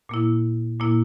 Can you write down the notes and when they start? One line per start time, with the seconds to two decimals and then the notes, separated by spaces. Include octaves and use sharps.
0.09 A#2 A#3 E4
0.80 A#2 A#3 E4